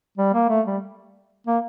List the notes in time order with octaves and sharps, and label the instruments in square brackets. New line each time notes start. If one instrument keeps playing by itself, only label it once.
[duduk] G3
A#3
A3
G3
A#3